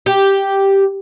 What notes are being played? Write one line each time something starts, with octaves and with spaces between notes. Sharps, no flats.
G4